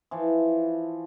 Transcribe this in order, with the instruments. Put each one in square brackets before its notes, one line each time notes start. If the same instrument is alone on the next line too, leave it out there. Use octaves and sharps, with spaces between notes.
[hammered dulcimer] E3 F3